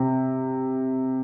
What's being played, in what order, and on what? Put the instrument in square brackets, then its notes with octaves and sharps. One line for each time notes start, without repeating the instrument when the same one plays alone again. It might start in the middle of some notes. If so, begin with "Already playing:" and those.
Already playing: [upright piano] C3